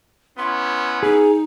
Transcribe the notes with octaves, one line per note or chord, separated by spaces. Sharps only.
B3 C#4 E4 C6
D#4 G#4